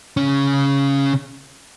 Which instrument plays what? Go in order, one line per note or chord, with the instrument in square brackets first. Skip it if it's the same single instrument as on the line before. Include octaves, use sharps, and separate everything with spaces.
[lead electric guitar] C#3 C#4